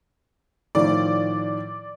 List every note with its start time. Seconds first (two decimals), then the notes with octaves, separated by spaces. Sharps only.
0.75 A2 D#3 F3 D5